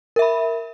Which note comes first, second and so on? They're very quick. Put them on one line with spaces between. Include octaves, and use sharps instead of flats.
A#4 E5 B5